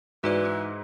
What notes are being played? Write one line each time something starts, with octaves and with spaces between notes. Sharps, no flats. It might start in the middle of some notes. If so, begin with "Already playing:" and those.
G#2 E3 F#4 B4 D5
D#4